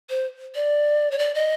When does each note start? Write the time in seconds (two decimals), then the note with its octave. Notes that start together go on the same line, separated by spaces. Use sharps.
0.10 C5
0.55 D5
1.11 C#5
1.19 D5
1.34 D#5